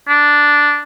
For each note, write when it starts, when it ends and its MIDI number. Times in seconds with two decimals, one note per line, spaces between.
0.08 0.82 62